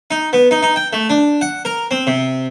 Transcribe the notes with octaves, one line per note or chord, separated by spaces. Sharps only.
D#4
B3
D#4
D#4
G5
A3
D4
F#5
A#4
C4
C3